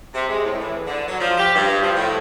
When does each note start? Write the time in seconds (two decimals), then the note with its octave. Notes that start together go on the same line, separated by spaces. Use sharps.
0.14 C3
0.29 G#3
0.44 A2
0.60 E3
0.87 D3
1.08 F#3
1.20 F3
1.38 G4
1.55 G2
1.82 F3
1.96 A2